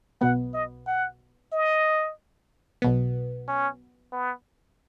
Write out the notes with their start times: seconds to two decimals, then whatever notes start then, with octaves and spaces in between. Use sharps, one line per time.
0.21 B1 B2 B3 F#5
0.54 D#5
0.87 F#5
1.53 D#5
2.82 B1 B2 B3
3.48 C#4
4.12 B3